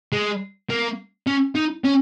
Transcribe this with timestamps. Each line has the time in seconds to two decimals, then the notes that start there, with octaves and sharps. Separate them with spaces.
0.13 G#3
0.70 A#3
1.27 C#4
1.55 D#4
1.85 C#4